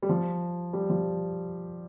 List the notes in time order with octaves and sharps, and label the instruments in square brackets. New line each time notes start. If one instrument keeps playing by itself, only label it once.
[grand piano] G3
F3
G3
F3